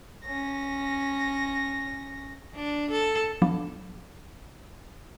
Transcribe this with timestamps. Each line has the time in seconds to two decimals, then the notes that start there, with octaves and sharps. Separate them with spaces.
0.25 C#4 A#6
2.55 D4
2.91 A4
3.42 F3 F#3 B3 D4